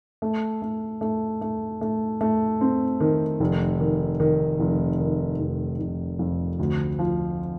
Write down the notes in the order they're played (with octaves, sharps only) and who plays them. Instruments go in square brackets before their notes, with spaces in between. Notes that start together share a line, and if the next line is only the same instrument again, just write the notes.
[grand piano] A3
A3
A3
A3
A3
A3
C4
D#3
F1
D#3
D#3
F1
D#3
F1
F1
F2
D2
F3